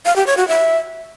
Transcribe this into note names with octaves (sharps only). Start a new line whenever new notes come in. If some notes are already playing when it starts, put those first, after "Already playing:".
F5
G4
C#5
F#4
E5